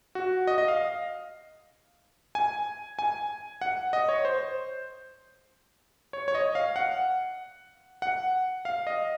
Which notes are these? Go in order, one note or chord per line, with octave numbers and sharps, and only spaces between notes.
F#4
D#5
D#5
F5
G#5
G#5
F#5
D#5
C#5
C5
C#5
C#5
D#5
F5
F#5
F#5
F5
D#5